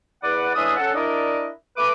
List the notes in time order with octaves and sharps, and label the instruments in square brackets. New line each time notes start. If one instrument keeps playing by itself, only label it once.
[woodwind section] E2 B4 D5 F#5
A2 E3 G#3 D4 E5 D#6
C#4 A4 F#5 A5
D4 E4 A#4 D5 D#5
A3 B4 D6